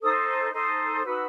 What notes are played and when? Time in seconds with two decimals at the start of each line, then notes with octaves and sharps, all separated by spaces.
0.01 D#4 A4 C5 D#6
0.53 D#4 A4 C5
1.05 D#4 F#4 B4 E6